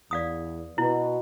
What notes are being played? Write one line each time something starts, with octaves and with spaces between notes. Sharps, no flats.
E2 D5 F5 D#6
B2 E4